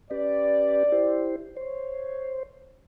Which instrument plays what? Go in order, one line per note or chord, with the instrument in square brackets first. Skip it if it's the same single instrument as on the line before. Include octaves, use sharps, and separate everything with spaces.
[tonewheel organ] C#4 G4 B4 [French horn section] D5
[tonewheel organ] E4 G4 C5
[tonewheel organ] C5 [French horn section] C#5